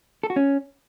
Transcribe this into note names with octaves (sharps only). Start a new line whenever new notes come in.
A4
F#4
C#4